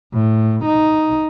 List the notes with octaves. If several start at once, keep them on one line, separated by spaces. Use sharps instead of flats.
A2
D#4